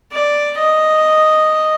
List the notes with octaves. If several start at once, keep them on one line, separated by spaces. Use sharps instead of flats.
D5
D#5